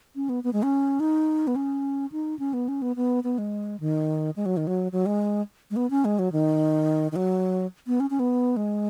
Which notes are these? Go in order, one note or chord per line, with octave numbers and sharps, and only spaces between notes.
C#4
B3
B3
G#3
C#4
D#4
B3
C#4
D#4
C#4
B3
C#4
B3
B3
B3
G#3
D#3
G#3
F#3
D#3
F#3
F#3
G#3
G#3
B3
C#4
G#3
F#3
D#3
D#3
F#3
B3
C#4
C#4
B3
G#3